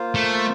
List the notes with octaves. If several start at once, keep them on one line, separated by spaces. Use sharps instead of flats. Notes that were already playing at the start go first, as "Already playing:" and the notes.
Already playing: A#3 F4 C5 F5
A3